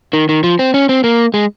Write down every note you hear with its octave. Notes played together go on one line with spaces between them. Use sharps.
D#3
D#3
F3
C4
C#4
C4
A#3
G#3